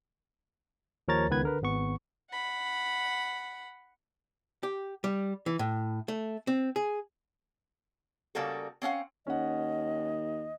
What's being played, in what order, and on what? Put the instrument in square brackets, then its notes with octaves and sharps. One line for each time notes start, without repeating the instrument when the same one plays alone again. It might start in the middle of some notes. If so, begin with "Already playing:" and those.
[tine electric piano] D#2 F3 A#4 C#5 A#5 A6
C#2 D#3 B3 B4 G#6
D3 A#4 B4
G#1 B3 C#6
[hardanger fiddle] F#5 B5
[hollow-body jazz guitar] G4
G3
E3
A2
A3
C4
G#4
[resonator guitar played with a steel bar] C#3 G3 A#3 F#4 A4
C4 C#4 F5 F#5
[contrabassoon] D#2 [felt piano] C#4 F#5 [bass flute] D#5